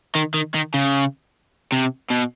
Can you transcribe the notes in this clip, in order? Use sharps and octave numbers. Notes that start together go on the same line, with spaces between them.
D#3
D#3
D#3
C#3
C3
B2